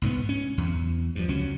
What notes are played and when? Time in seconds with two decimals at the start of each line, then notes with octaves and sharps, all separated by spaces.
0.02 C2 G#2 F3 B3
0.29 C#4
0.58 E2
1.15 G2 F3
1.28 C#2 F#3 C#4